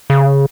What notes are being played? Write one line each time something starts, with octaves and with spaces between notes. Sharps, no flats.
C#3